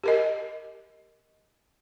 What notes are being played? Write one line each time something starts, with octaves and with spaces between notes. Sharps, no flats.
G4 A#4 D#5